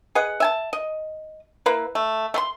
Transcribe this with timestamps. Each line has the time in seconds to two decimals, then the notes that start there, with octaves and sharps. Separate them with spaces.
0.15 G#4 B4 D#5 F#5
0.40 E5 G#5 A5
0.73 D#5
1.66 A#3 E4 B4
1.95 A3
2.34 A3 C6